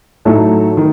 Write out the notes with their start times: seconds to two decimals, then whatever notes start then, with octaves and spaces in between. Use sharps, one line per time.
0.25 A2 F#3 A3 D#4 A4
0.77 D#3